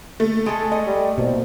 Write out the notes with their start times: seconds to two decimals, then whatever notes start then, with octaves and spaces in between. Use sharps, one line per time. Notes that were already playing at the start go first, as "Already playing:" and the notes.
0.20 A3
0.46 G#3 A4
0.72 D#5
0.87 G3
1.18 C2 B2 A#3